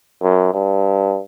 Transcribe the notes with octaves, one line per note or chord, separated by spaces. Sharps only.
F#2
G2